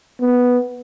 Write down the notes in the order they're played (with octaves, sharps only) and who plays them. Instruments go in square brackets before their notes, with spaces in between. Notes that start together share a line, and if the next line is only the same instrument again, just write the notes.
[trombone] B3